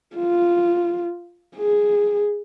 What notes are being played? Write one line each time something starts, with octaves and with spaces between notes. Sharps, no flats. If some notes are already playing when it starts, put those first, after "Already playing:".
F4
G#4